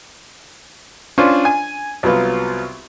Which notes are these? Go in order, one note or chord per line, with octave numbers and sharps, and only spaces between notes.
C#4 D4 F4 C5
G#5
C2 F#3 B3 F4